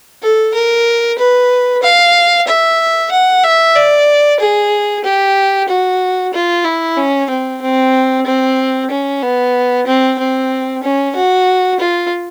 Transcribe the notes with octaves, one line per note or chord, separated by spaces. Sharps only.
A4
A#4
B4
F5
E5
F#5
E5
D5
G#4
G4
F#4
F4
E4
C#4
C4
C4
C4
C#4
B3
C4
C4
C#4
F#4
F4